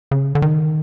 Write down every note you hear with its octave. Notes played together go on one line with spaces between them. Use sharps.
C#3
D3
D#3